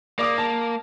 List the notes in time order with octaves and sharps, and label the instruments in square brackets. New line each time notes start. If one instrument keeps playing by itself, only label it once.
[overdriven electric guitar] A#3 [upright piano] D5 D6 D#6
[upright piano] A5